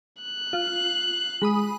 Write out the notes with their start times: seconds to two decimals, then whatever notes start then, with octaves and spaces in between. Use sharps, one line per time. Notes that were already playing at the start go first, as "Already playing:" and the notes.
0.22 F#6
0.53 F4
1.42 G#3 B5 D#6